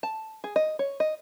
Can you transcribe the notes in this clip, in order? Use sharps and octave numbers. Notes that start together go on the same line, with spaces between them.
A5
G#4
D#5
C#5
D#5